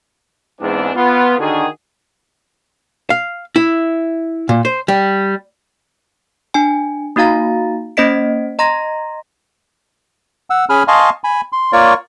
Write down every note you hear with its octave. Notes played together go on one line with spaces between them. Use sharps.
E2 G#2 C4 D4
B3 F4
D3 D#3 F#4 G#4
F5
E4
A#2
C5
G3
D4 G#5
A#3 D#4 F#4 F5 A#5 A6
A#3 C#4 C5 D#5 B6 D7
D#5 A#5 C6 A#6
F#5 E6
C#4 G#4 G#5 B5 F6
D#5 F5 G#5 A5 C6 C#6
G#5 B5
C6
A#3 F4 A#4 C#5 D5 C#6